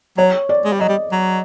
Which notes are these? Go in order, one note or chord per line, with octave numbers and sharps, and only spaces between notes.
F#3 C#5
D5
G#3
G3
F#3 D#5
G3
F#3